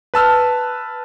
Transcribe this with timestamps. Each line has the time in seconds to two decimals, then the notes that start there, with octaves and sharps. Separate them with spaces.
0.14 B4 A5 E6 F6